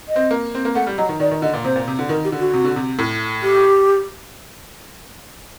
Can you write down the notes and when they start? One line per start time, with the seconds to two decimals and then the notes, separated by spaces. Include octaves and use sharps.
0.09 D#5
0.16 C4
0.31 A#3
0.55 C4
0.65 A#3
0.75 A3 F#5
0.87 G3
0.98 F#3 D#5
1.09 D#3
1.20 D#3 D5
1.31 D#3
1.42 D3 D#5
1.54 A#2
1.65 C3 C5
1.76 A#2
1.88 C3
1.99 D3
2.09 D#3 A#4
2.24 G4
2.32 D3
2.39 F#4
2.53 C3
2.65 D3
2.76 C3
2.99 A2
3.43 G4